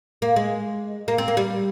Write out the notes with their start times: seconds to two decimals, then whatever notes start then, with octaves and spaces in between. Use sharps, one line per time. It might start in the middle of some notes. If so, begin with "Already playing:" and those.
0.22 A#3
0.36 G#3
1.08 A#3
1.18 C4
1.28 A#3
1.37 G3